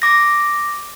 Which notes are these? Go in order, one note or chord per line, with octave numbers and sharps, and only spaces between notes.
D6 A#6